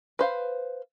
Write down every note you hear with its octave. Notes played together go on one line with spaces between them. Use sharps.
B4 C5 F5